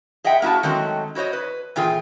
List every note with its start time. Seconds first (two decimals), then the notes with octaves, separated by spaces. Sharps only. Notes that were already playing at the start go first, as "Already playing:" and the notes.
0.24 G#4 D#5 E5 F#5 G5
0.42 A#3 E4 F#4 G#4 A5
0.63 D#3 F#3 G#3 A3 C4 F#4
1.15 E4 F#4 C5 C#5 D#5
1.33 B4
1.76 A#2 E3 F4 G#4 G5